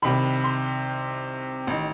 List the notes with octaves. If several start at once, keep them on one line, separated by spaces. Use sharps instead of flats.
C2 C3 D#3 B5
C6
A1 D#3